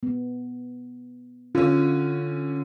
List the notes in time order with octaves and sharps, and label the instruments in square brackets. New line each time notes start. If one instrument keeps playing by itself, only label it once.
[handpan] B3
[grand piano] D3 C#4 [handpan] F4